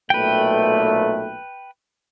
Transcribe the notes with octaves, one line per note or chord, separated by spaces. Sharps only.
B1 A#2 A3 B4 G5